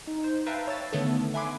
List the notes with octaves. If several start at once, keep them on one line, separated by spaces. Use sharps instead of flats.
D#4
C5
B4 E5 F5 G5 A5 A#5
C#5 E6 A6
D3 D#3 A3 B3 A4
E5 F#5 G#5 B5 C6 D6